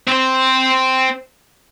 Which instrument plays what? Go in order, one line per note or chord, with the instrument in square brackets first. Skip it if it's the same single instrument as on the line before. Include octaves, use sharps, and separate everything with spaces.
[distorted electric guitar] C4 C5